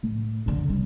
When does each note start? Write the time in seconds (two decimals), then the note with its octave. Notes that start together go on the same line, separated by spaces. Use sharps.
0.03 A2
0.46 F#2 D3
0.70 C3 G3